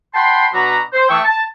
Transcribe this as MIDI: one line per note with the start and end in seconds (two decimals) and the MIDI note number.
0.15 0.47 78
0.15 0.47 79
0.15 0.47 81
0.15 0.47 83
0.15 0.47 84
0.54 0.80 47
0.54 0.80 62
0.54 0.80 66
0.54 0.80 71
0.54 0.80 82
0.93 1.05 72
1.09 1.19 52
1.09 1.19 57
1.09 1.19 79
1.09 1.19 85
1.09 1.19 87
1.09 1.19 88
1.24 1.42 81